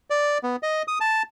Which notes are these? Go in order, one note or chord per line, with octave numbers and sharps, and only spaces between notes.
D5
B3
D#5
D#6
A5